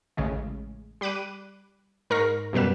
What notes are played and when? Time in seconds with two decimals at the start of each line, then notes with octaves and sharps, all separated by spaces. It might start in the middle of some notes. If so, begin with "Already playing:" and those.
0.17 A1 C#3 G#3
1.01 G3 B5 D6 F#6 D#7
2.10 G#2 A#4 C#6 F6 A#6 C7
2.53 F#2 B2 G3 B4 E7